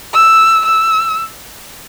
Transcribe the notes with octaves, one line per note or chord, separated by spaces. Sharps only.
E6
E6